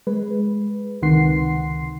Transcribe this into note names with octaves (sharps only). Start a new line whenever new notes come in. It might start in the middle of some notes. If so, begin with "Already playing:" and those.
G#3 B4
C#2 C3 D#3 F#5 C6 C7